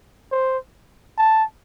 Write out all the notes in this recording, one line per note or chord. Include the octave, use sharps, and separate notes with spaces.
C5
A5